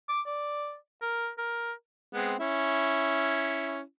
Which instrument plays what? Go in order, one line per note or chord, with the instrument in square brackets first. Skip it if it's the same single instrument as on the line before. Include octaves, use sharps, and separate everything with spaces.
[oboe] D6
D5
A#4
A#4
[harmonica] G#3 B3 C4
C#4 E4